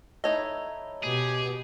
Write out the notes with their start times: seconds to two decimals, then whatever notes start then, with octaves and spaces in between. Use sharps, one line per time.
0.24 A3 D#4 E4 C#5 D#5
1.04 B2 G4 G#4